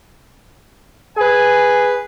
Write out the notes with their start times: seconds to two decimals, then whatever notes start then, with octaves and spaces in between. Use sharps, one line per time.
1.17 G#4 B4 G#5